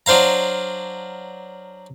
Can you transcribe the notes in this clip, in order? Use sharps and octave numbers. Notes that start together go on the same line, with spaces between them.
F#3 D4 C5 F5 A#5